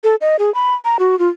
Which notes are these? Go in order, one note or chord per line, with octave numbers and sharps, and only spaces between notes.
A4
D#5
G#4
B5
A#5
F#4
F4